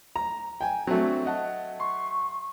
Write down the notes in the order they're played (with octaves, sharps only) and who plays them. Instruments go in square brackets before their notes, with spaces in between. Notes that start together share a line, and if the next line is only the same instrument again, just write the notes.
[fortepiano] A#5
G5 G#5
[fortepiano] F#3 A3 [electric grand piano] C4 D4 F#4
[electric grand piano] D#5 F#5 A5
[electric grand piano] C6 [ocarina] C#6